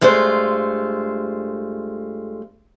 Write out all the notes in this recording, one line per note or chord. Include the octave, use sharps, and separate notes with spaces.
G2 G#3 A3 F4 C5